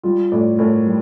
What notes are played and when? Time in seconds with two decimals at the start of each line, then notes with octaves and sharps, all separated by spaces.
0.03 G3 F4
0.32 A2 D5
0.58 A2 A#4
0.86 G3